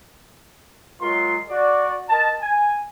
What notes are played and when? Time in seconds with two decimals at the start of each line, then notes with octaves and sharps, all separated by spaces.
1.02 F#3 G#3 F4 A#4 C6
1.50 F#4 D5
2.10 A#4 D#5 A5
2.41 G#5